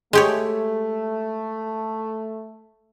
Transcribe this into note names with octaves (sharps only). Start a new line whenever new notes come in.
G#3 A3 G4 C#5